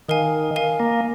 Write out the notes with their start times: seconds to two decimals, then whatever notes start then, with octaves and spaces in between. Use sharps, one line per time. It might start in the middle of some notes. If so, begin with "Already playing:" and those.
0.09 D#3 A#4 F5 G#5
0.56 A#4 F5 G#5
0.80 A#3